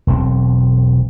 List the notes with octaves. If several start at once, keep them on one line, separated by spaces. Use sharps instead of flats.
E1 B1 C4